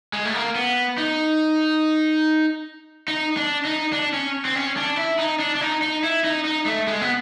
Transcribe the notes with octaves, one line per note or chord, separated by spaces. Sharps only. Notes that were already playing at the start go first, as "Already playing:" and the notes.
G#3
A3
A#3
B3
D#4
D#4
D4
D#4
D4
C#4
C4
C#4
D4
E4
D#4
D4
D4
D#4
D#4
E4
D#4
D#4
A3
G#3
B3